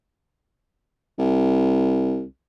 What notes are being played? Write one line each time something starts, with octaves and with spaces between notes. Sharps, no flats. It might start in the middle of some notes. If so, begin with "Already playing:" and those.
C2